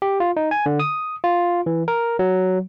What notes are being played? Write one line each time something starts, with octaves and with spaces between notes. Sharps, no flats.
G4
F4
D#4
G#5
D3
D#6
F4
E3
A#4
F#3